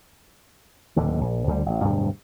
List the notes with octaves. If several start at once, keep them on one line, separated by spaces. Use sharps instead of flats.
D1 D#2 D3
A#1
D2 D3 F#3 G3
A1
D1 G2 B2